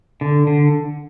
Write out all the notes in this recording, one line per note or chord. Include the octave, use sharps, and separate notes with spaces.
D3
D3